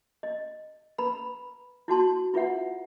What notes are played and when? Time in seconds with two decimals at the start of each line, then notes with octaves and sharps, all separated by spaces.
0.23 D#5
0.98 B4 A#5 B5
1.88 E4 F#4 A5 C6
2.34 E4 F4 B4 E5 F#5